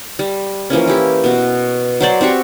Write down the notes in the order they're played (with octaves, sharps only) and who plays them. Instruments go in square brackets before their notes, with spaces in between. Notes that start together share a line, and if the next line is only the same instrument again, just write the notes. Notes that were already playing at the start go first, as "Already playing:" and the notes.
[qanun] G3
E3 F3 A#3 C#4
E4 G4
B2 F#4
F#3 C5 D5
C4 F#4 G4 C#6